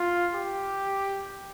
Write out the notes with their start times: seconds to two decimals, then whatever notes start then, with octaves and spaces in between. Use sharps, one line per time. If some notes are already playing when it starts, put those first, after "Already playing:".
Already playing: F4
0.34 G4